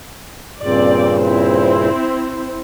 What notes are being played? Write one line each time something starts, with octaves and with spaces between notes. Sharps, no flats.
G2 A#2 C#3 C4 D5
C4 E4 C5